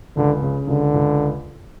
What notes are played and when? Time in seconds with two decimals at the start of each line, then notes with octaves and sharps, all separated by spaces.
0.16 C#2 D3
0.42 C#3
0.67 C#2 D3
0.94 C#2